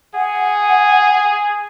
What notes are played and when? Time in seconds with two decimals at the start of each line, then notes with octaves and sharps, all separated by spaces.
0.15 G#4 F#5